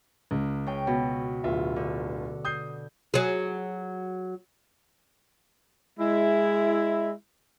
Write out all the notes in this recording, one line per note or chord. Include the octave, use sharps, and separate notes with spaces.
C#2
C#3 G5
B2
D1 F4 E5
D3
D#6 G6 C7
F#3 G#4
G#3 E4